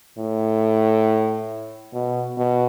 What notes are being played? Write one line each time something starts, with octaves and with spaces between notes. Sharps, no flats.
A2
B2
B2